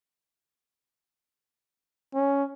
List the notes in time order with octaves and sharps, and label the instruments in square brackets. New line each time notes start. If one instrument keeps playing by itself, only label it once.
[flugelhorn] C#4